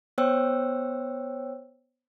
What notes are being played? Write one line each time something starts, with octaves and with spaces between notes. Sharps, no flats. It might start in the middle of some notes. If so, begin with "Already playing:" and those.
B3 C5 C#5 G5 E6